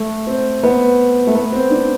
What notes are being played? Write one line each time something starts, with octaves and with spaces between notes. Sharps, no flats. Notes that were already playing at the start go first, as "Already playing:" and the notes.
Already playing: A3
C4
B3
A3
B3
C4
D4